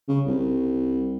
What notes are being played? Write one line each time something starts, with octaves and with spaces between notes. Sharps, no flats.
C#3
C2